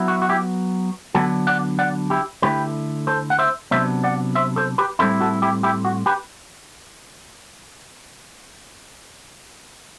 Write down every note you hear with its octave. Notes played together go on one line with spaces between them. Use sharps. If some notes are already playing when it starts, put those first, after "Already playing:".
Already playing: F#3 B3 E4
F#4
F#4
E4 G4
D3 F#3 B3 D4 F#4 A4
D5 F#5
D5 F#5
E4 G4
D3 A3 E4 G4 B4
A4 C5
F#5
C5 E5
C3 F#3 B3 D4 C5 E5
D5 F#5
C5 E5
A4 C5
G4 B4
A2 G3 C4 E4 A4 C5
F#4 A4
E4 G4
E4 G4
F#4
G4 B4